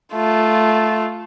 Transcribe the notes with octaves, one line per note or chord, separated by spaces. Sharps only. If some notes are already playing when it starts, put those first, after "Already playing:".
A3 F4